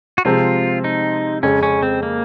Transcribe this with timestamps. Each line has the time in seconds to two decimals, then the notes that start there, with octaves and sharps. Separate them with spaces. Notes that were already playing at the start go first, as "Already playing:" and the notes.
0.18 F#4
0.25 C3 F3 G#3 C4 F4
0.84 D#4
1.43 F2 C#3 G#3 C#4
1.63 C#4
1.83 C4
2.03 A#3